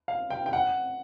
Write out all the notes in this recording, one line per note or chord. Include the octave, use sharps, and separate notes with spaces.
F5
G5
G5
F#5